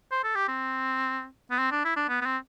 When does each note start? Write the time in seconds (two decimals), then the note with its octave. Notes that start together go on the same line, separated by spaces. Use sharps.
0.11 C5
0.24 A4
0.35 G4
0.48 C4
1.51 B3
1.59 C4
1.71 D4
1.85 E4
1.96 D4
2.09 B3
2.21 B3
2.26 C4